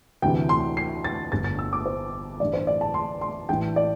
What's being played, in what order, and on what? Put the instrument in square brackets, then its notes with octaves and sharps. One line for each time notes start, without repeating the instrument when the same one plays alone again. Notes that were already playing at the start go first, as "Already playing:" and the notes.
[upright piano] D2 C3 E3 G5
C6
C7
A6
G1 G2 D3 A6
A6
E6
D6
C5
A1 G2 E3 D5
C5
D5
A5
C6
C6
A1 A2 E3 G5
D5